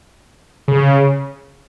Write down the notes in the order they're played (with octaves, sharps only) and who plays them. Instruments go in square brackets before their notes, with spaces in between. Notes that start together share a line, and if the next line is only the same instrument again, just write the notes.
[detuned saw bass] C#3